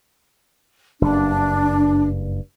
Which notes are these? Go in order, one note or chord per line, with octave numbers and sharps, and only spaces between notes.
F#1 G2 D4